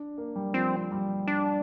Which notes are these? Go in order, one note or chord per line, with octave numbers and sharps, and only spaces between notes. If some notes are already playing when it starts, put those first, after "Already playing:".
Already playing: D4
A#3
G3
F3 C4
G3
D4